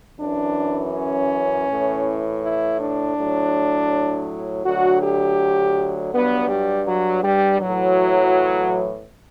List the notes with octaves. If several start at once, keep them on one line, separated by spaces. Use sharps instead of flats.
F#2 E3 D4
C#4
A2 E3
E4
D4
A2 F#3
D2 D3 F#3 F#4
G4
G2 F#3 B3
G3
F#3
G3
A2 E3 F#3